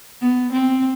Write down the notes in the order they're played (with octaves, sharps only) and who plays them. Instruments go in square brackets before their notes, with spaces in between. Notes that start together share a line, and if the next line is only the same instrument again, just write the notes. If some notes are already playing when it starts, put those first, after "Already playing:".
[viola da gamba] B3
C4